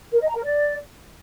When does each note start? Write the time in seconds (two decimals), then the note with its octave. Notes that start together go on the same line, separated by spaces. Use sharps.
0.13 A#4
0.20 D#5
0.28 A#5
0.36 A#4
0.43 D5